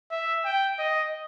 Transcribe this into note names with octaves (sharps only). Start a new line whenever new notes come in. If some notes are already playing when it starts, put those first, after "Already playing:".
E5
G5
D#5